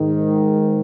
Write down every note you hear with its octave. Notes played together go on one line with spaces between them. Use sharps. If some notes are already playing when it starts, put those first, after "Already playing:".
Already playing: G#2 D#3